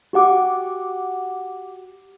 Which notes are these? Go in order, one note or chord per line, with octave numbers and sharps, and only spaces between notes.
F#4 G4 F#5 D6